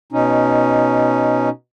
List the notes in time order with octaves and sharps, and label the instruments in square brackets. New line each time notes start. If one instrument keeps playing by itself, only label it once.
[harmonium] B2 C#4 D#4